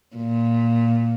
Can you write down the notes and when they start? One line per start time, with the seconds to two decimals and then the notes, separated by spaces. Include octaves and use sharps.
0.16 A#2